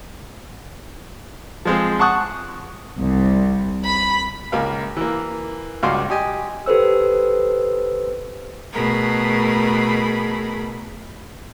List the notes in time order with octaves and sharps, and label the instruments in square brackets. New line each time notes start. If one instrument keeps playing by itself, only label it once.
[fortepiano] F3 G#3 C4
F#5 A5 C#6 D#6 F#6
[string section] C2
B5
[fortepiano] C#2 A#3 F5
E3 A#3
C#2 G2 F#4 F5 C6 D6
G4 D#5 G#5
[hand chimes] G4 A4 B4 C5 E6
[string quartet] B2 A3 G#4 A#4 B5